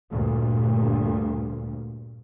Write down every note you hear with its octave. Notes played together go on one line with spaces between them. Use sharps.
D2 G2 A#2